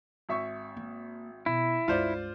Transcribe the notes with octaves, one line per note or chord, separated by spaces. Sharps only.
G#1 E5 C#6
A#3
B2 E4
C#2 G2 F4 C5 D5